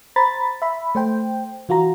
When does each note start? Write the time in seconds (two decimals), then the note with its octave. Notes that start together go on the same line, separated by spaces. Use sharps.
0.16 C5 A#5 B5 A6
0.62 E5 B5
0.95 A3 C5 G5
1.69 E3 F4 F#4 A#5